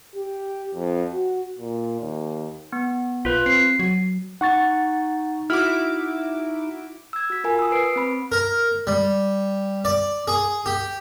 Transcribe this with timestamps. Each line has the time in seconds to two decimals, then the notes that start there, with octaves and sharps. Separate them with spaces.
0.16 G4
0.74 F2
1.13 F#4
1.59 A#2
2.01 D#2
2.73 B3
3.25 A#1 F4 B4
3.46 C4 C7
3.79 F#3
4.41 D#4 F#5 C#6 A6
5.50 E4 F#4 D6 F6
7.13 E6 G#6
7.30 F#4 B6
7.44 F4 A#4 G#5
7.59 D#6 E6
7.72 B4 C7 D7
7.96 C4 B5
8.32 A#4
8.87 G3
9.85 D5
10.28 G#4
10.66 G4